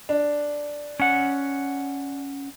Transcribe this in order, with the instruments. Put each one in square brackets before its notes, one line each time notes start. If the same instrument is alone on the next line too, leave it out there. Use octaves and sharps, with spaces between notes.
[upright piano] D4
[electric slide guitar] C#4 F#5